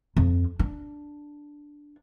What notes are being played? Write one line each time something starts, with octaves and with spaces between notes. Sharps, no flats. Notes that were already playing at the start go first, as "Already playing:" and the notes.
F2
D4